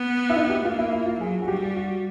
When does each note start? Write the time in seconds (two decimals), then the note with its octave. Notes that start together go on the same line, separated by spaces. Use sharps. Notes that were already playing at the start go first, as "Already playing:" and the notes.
Already playing: B3
0.30 E4
0.36 D#4
0.50 G4
0.65 A#3 F4
0.79 E4
0.92 E4
1.06 F4
1.20 F#3 G#4
1.42 F#4
1.48 G3 G4
1.63 F#4
1.77 F#4